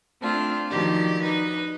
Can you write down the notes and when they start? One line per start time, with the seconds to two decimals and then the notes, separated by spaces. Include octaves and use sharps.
0.20 A3 C4 D4 F4
0.69 D#3 F3 F#3 G4 D5
1.22 D#4 B4